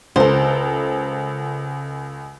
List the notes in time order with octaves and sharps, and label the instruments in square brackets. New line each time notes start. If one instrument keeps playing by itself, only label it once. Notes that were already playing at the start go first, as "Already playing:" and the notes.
[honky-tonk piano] C#2 A4 [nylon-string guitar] A#4 C5